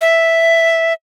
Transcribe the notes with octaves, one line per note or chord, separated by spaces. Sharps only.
E5